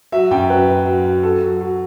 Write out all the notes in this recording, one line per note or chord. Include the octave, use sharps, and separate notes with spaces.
F#3 E5
F#2 G5
F#3 B4
F#3
F#3
F#3
F#3 A4
F#3
F#3